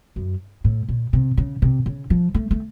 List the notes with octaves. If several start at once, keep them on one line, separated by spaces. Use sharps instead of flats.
F#2
A2
A#2
C3
C#3
C3
C#3
F3
A3
A3